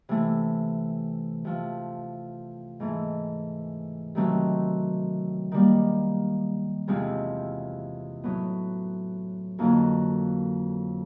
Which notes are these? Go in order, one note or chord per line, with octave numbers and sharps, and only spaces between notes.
C3 E3 A3
C3 F3 A3
G#2 E3 A3
C3 D#3 F#3 A3 C4
D#3 G3 A#3
E2 C3 F3 G#3 C4
A2 F#3 B3
F2 D3 F#3 A#3 D#4